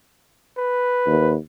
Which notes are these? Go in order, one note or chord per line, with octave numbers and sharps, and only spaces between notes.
B4
D#2